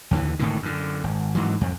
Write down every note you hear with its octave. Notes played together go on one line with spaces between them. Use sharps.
D#2 D3 E3
G#1 A2 D3 D#3
F#2 D3
G#1
G#2 E3 F#3
F2